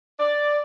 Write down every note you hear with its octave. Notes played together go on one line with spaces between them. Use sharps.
D5